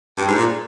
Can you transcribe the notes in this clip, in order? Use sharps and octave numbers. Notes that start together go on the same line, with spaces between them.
G2
G#2
A#2